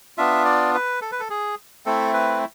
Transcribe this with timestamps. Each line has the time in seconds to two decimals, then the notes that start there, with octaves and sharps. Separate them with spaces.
0.18 B3 D4 F4 E5
0.45 D5
0.74 B4
1.02 A4
1.12 B4
1.20 A4
1.30 G#4
1.86 A3 C4 E4 A4
2.13 B4